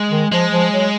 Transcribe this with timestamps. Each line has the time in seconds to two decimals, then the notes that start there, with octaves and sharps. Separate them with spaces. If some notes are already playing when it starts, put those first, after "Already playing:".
Already playing: G#3
0.11 D#3
0.31 F3 G#3
0.51 F3
0.72 F#3